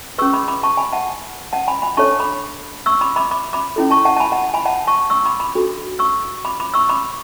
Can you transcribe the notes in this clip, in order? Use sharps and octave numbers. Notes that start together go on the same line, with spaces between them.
C#4 G#4 B4 C#6 E6
B5 D6
B5 D6
A5 C#6
G#5 B5
F#5 A5
F#5 A5
G#5 B5
G#5 B5
D4 A4 C#5 A5 C#6
B5 D6
C#6 E6
B5 D6
B5 D6
B5 D6
B5 D6
C#4 E4 A4
A5 C#6
F#5 A5
A5
G#5 B5
F#5 A5
G#5 B5
F#5 A5
A5 C#6
C#6 E6
B5 D6
B5 D6
D4 F#4 A4
C#6 E6
B5 D6
B5 D6
C#6 E6
B5 D6